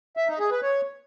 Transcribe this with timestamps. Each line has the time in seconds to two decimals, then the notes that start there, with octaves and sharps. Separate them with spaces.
0.17 E5
0.28 D#4
0.40 G#4
0.51 B4
0.63 C#5